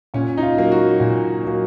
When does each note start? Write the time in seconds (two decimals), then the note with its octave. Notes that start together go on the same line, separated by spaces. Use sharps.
0.14 A#2 C#4
0.37 D#4
0.43 F4
0.57 F#3 A#3
0.72 F#4
1.00 A#2
1.43 F#3 A#3